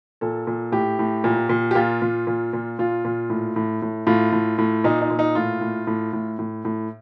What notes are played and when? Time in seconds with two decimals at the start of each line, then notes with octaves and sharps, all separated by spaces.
0.21 A#2 A4
0.47 A#2
0.72 A2 G4
0.99 A2
1.24 A#2
1.49 A#2
1.71 G4
1.75 A#2 F4
2.02 A#2
2.27 A#2
2.53 A#2
2.79 A#2 F4
3.05 A#2
3.30 A2
3.56 A2
3.82 A2
4.07 A2 F4
4.32 A2
4.58 A2
4.84 A#2 D#4
5.01 D#4
5.11 A#2
5.19 D#4
5.35 A2 F4
5.61 A2
5.87 A2
6.13 A2
6.39 A2
6.65 A2